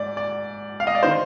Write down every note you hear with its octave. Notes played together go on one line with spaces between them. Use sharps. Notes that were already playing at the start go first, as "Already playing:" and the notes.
Already playing: G#2 D5
D5
F5
D#5
D5
D#3 C5